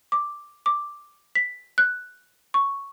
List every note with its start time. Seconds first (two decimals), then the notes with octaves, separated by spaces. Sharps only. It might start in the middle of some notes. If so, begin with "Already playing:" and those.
0.12 D6
0.66 D6
1.35 B6
1.78 F#6
2.54 C#6